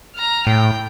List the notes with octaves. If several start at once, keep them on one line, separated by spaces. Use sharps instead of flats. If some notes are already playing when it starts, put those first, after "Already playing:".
A#5 F6
A2 G5